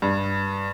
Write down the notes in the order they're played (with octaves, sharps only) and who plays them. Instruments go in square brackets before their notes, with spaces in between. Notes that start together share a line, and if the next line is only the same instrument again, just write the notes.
[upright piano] G2